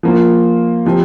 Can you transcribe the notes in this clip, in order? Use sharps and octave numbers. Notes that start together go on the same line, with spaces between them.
F3 A#3 F4
C3 F3 C4